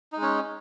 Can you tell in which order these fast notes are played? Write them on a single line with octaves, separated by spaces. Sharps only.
D#4 G#3 C#4